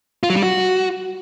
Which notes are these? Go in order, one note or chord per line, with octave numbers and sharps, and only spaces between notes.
F4
F#3
G3
F#4